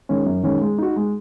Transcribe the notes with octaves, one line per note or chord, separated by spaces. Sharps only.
D#3 G#3 C#4
F#2
D#3 G#3 C#4
G#3
D#4 F#4
G#3